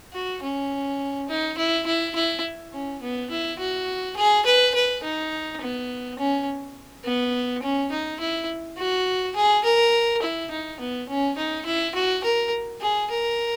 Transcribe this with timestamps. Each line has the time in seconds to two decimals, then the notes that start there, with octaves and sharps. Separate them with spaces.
0.13 F#4
0.43 C#4
1.29 D#4
1.58 E4
1.86 E4
2.15 E4
2.73 C#4
3.02 B3
3.30 E4
3.59 F#4
4.17 G#4
4.46 B4
4.75 B4
5.03 D#4
5.61 B3
6.19 C#4
7.05 B3
7.62 C#4
7.91 D#4
8.20 E4
8.78 F#4
9.36 G#4
9.64 A#4
10.22 E4
10.51 D#4
10.80 B3
11.08 C#4
11.38 D#4
11.66 E4
11.95 F#4
12.24 A#4
12.81 G#4
13.10 A#4